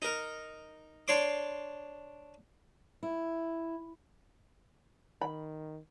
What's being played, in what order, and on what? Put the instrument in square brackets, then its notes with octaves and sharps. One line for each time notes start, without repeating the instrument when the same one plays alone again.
[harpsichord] D#4 A#4
D4 C#5 C6 D6
[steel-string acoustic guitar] E4
[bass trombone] D#3 [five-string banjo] B5